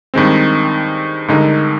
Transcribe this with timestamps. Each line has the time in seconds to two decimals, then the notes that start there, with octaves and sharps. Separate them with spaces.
0.14 G2 D#3 G#3 C4
1.28 G2 D3 G#3 D#4 A#4